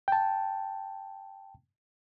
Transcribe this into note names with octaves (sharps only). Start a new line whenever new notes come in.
G5 A5